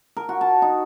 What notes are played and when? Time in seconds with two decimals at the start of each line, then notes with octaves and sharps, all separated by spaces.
0.17 A#4
0.29 F#4
0.41 A5
0.62 D#4